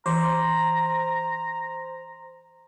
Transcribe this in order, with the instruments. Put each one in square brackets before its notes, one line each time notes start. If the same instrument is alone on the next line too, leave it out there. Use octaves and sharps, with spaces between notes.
[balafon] E3 [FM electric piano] C5 [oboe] A#5